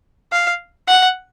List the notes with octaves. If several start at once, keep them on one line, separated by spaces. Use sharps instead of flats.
F5
F#5